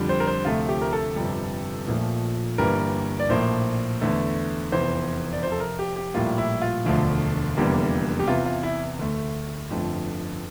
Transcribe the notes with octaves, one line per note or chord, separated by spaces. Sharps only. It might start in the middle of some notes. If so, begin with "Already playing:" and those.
Already playing: F2 D3 G3
C5
A#4
C5
D2 C3 F3 A3 F4
G4
A#4
A4
G1 F2 C3 G3
A#1 A#2 F3 A3
G1 G2 E3 G3 A#3 A#4
D5
A#1 A2 F3 A#3 C5
E2 D3 A3
F1 E2 E3 C5
D5
F2 C3 F3 C5
A4
A#4
G4
G4
A#1 A2 G3 A#3 F4
E4
F4
E1 D2 D3 F3 A3
F1 E2 D3 G3 A#3
G4
E2 C3 E3 F4
F4
E4
D2 D3 A3
G1 F2 D3 F3 A3